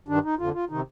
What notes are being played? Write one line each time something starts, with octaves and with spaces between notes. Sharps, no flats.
G2 D#3 D4
D#4
F2 D3 F4
F4
C3 D#3 D#4